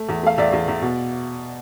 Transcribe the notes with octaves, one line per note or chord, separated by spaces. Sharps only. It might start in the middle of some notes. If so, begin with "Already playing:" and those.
Already playing: A3
E2
A3 F5
E2 D5 E5
E2
E2
B2